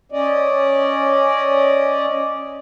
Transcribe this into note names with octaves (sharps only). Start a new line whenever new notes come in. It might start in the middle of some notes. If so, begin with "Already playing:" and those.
C#4 D5 D#5